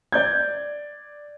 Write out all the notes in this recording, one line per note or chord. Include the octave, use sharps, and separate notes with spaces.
D5 G6 G#6